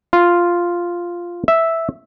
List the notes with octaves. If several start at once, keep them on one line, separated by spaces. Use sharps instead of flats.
F4
E5